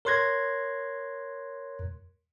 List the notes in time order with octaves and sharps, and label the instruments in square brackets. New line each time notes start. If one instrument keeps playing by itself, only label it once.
[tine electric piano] A#4 C#5 C6 F#6 G#6 A#6